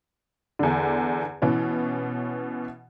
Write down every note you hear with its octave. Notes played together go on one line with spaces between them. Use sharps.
E2 D3
B2 E3 C#4